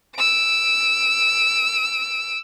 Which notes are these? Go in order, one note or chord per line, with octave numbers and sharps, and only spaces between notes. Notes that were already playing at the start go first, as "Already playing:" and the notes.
E6 D7